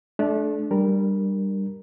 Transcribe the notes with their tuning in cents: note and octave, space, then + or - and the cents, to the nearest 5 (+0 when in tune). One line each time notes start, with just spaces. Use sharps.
A3 -30 D4 +0
G3 +0 D4 +25 A#4 +0